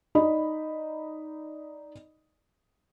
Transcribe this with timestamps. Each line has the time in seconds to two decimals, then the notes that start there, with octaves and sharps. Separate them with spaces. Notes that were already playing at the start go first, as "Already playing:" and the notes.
0.15 D#4 D5 D#5 B5